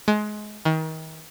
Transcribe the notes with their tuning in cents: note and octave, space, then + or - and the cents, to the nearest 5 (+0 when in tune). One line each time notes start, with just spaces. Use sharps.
G#3 +25
D#3 +35